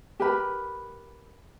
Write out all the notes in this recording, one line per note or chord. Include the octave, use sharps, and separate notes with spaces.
G4 A#4 B4 B5